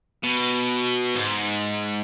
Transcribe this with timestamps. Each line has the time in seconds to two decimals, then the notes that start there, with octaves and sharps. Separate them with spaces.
0.23 B2
1.15 G#2